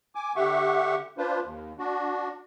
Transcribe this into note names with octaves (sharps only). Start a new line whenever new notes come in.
G#5 D6
D3 G4 E5 F#5 C#6
D4 F4 B4 C5
D#2
D4 F#4